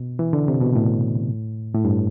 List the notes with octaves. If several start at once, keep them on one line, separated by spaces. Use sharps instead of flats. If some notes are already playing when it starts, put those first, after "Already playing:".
Already playing: B2
E3
D3
C3
B2
A2
A2
G2